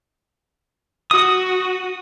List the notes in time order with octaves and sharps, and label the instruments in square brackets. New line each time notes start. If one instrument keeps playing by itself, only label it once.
[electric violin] F#4 [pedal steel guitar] D#6